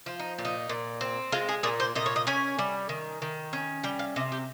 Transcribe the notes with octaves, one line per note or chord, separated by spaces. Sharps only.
F3 F4
D#4
A#2
D#4
A#2
C4
G#3 F4
G#4
A#2 G#4
C5
A#2 D#5
C#5
D#5
C#4 G#5
G3
D#3
D#3
C#4
G3 G5
F5
C3 D#5
G4